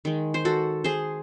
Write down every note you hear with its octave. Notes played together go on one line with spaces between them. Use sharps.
D#3 G#3
C5
F#4 A4
G#4 C5